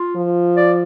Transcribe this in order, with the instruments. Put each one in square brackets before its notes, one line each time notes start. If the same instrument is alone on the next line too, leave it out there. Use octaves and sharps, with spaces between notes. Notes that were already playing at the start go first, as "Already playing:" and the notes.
Already playing: [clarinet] F4
[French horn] F3
[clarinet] D5